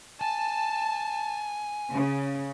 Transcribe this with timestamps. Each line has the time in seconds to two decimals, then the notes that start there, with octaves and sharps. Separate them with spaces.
0.21 G#5 A5
1.91 C#3